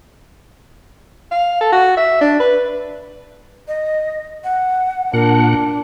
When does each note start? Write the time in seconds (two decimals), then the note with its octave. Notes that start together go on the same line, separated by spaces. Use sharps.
1.31 F5
1.61 A4
1.73 F#4
1.97 E5
2.21 D4
2.40 B4
3.68 D#5
4.44 F#5
5.14 A#2 D4 A#4 F#5